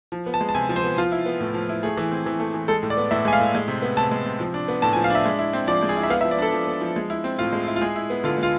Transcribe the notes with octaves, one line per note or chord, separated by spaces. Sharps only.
F3
B3
A5
G#3
A5
C3 G#5
F3
C5
B3
F3 F4
E4
B3
A2
F3
E4
A3 G#4
E3
C4
E3
A3
E3
G#3 A4
A2
D5
B3
A2 E5
G#3 G#5
F5
A2
G#3
C3
B3
C3 A5
G#3
C3
F3
D4
B3
A2 A5
G#5
F3
F5
D4 E5
G#3
E4
C4
F3 D5
G#3
G#4
E4
E5
B3 F5
E5
F3
D5
D4 A4
F3
B3
F3
G#3
E4
C4
A2 F4
G#3
E4
F4
G#3 G#4
E4
B3
D3 F4
G#3 F4